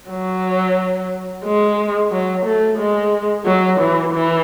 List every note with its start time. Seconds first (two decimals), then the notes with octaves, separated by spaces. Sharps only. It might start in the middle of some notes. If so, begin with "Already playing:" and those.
0.10 F#3
1.45 G#3
2.12 F#3
2.46 A3
2.79 G#3
3.46 F#3
3.80 E3
4.13 E3